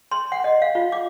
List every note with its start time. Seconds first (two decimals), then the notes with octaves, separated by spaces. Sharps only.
0.12 C6
0.32 F#5
0.44 D#5
0.62 F5
0.75 F4
0.92 D6